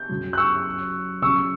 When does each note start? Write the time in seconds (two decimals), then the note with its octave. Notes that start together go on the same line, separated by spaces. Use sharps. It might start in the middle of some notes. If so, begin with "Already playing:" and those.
Already playing: G6
0.09 F#2 C#3 F#3
0.33 F#6
0.38 C#6 E6
1.22 C#3 F#3 C#4 C#6 E6